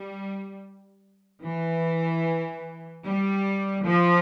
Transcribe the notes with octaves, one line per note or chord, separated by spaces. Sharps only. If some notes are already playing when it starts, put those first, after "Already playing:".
Already playing: G3
E3
G3
F3